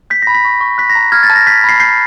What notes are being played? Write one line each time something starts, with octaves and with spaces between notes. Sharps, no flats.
G6 B6
B5 A#6
B6
C#6
C#6
F#6 B6
A#6
A#5
F6 G#6
A6
A5
A#6
G6 B6
B5 C7
G6 C7